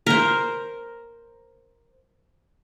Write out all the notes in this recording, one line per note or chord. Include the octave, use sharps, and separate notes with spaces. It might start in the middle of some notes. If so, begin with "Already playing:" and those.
A#4 C5